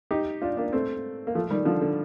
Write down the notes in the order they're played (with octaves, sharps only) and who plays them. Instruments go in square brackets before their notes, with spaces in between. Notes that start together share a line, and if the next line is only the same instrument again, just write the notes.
[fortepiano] D#4 G4
D4 F4
A#3 D4
A3 C4
A#3
F3 A3
D#3 G3
D3 F3
D3